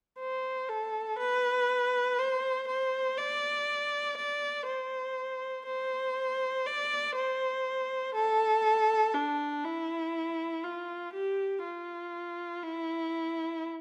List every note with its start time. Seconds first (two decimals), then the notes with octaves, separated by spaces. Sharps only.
0.19 C5
0.69 A4
1.19 B4
2.18 C5
2.68 C5
3.18 D5
4.17 D5
4.67 C5
5.66 C5
6.66 D5
7.16 C5
8.15 A4
9.14 D4
9.64 E4
10.64 F4
11.13 G4
11.63 F4
12.63 E4